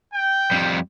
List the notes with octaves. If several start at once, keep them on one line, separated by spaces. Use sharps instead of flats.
G5
F2 G3